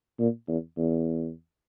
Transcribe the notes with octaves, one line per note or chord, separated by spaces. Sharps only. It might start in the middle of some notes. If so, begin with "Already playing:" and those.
A#2
E2
E2